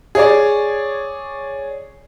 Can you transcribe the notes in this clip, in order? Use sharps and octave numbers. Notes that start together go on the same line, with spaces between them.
G#4 C#5 D5